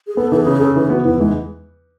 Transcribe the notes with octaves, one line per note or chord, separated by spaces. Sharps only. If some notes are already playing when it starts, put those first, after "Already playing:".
G#4
B3 A4
E3 A4
G#4
C#3
C#3 A4
E3 G#4
B3 F#4
E2 E4
E3 G#3